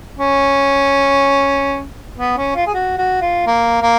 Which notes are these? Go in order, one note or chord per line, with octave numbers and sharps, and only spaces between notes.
C#4
B3
C#4
F4
G#4
F#4
F#4
F4
A#3
A#3